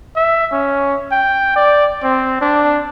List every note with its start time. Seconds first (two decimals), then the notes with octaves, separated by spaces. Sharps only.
0.16 E5
0.52 C#4
1.12 G5
1.56 D5
2.03 C4
2.41 D4